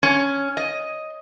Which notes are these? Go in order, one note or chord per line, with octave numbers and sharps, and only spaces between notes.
C#4
D#5